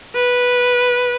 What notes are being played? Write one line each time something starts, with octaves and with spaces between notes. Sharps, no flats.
B4